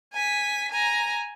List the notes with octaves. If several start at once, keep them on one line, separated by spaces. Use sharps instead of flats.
G#5 B6
G#5 A#5